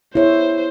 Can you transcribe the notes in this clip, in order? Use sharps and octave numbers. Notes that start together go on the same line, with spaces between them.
B3 E4 G#4 C5 C#5 E5